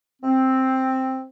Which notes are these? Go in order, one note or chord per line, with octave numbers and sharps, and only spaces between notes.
C4